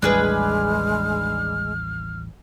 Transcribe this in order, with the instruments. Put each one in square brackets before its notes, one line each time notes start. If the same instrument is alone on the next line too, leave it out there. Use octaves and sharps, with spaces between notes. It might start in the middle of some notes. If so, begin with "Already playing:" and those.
[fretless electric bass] A1 D#2 G3 [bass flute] G#3 [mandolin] D4 G#4 B4 [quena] F6